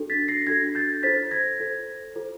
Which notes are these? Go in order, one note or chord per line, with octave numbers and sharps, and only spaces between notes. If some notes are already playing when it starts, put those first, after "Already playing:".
Already playing: D4 F#4 A4
A6 B6
A#6 C7
D4 F#4 A4 G#6 A#6
G6 A6
F4 A4 C5 A6 B6
G#6 A#6
F4 A4 C5
F4 A4 C5